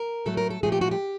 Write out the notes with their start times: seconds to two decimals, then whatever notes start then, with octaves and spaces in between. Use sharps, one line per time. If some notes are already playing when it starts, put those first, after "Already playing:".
Already playing: A#4
0.26 A2 F#3 A3 A4
0.37 A#4
0.50 A4
0.63 A#2 F3 A3 G#4
0.72 G4
0.81 F#4
0.91 G4